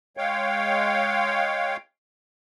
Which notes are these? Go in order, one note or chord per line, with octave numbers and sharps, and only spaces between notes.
G#3 C#5 F5 G5